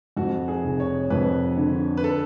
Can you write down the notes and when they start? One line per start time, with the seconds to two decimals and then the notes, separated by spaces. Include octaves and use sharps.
0.17 F2 F#4
0.48 G#4
0.64 F1
0.80 C#5
1.10 F2 B4
1.57 D3
1.97 B4
2.04 A4